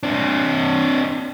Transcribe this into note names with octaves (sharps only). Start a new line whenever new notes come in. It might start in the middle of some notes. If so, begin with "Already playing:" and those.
C4 D4